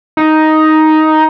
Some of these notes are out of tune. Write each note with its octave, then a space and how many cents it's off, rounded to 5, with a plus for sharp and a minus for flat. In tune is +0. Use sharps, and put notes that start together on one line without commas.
D#4 +5